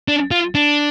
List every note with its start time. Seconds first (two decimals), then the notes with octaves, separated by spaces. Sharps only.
0.08 D4
0.31 F4
0.55 D4